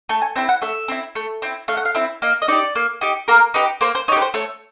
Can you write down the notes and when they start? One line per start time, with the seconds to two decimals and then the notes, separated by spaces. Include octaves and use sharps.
0.09 A3 A5
0.22 G#5
0.36 C4 E4 G5
0.49 F#5
0.62 A3 E5
0.88 C4 E4
1.15 A3
1.42 C4 E4
1.68 A3 F5
1.77 F#5
1.85 F5
1.95 C4 E4 E5
2.22 A#3 D#5
2.42 D#5
2.48 D#4 G4 D5
2.76 A#3
3.01 D#4 G4
3.28 A#3 A#4
3.54 D#4 G4 B4
3.81 A#3 C5
3.95 C5
4.08 D#4 C#5
4.12 G4 B4
4.22 C5
4.34 A3 C#5